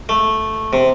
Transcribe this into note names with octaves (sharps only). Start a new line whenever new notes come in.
A3
C3